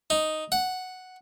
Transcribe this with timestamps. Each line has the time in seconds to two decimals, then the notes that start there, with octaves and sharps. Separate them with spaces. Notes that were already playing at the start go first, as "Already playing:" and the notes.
0.10 D#4
0.52 F#5